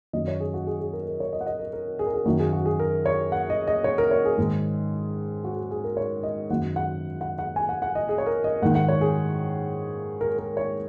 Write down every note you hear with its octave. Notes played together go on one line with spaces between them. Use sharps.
F#2 D#3 D#5
C#5
G#4
F#4
G#4
G#4
A#4
A#4
C#5
D#5
F#5
D#5
A#4
A#4
G#4
A#4
G#4
F#2 D#3 F#4
G#4
F#4
G#4
A#4
C#5
F#5
D#5
D#5
C#5
A#4
C#5
G#4
G#2 D#3
F#4
G#4
G#4
A#4
C#5
D#5
F#2 D#3 F#5
F#5
F#5
F#5
G#5
F#5
F#5
D#5
G#4
C#5
A#4
D#5
G#2 D#3 F#5
F#5
C#5
G#4
A#4
A#4
C#5